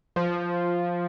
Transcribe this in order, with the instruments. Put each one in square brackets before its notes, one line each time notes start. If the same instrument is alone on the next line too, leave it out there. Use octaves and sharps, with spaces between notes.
[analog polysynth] F3